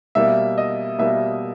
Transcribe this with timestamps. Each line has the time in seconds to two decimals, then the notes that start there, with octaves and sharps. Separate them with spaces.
0.15 B2 G3 A#3 E5
0.58 D#5
0.99 B2 G3 A#3 E5